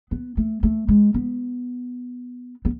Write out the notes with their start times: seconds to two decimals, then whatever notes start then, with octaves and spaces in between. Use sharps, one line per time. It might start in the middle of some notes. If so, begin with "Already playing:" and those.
0.11 B3
0.37 A3
0.63 A3
0.88 G#3
1.14 B3
2.65 B3